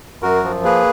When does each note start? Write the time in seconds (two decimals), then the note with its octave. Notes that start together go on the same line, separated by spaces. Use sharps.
0.23 F#2 F#4 A#4
0.44 F3
0.64 A#3 G#4 B4